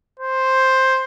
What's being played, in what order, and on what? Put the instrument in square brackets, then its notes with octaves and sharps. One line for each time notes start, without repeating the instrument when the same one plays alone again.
[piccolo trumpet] C5